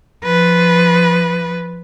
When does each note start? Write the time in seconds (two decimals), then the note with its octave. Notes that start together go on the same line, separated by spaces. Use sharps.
0.24 F3 B4